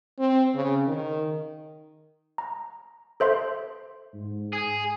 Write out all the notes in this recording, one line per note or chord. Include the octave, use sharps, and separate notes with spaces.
C4
C#3
D#3
A#5
A4 C5 E5 C6
G#2
G#4